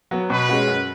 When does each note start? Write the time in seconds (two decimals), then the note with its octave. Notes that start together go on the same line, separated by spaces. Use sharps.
0.11 F#3 B3
0.30 B2 B4
0.49 G#3 C#4 F#4
0.68 F#2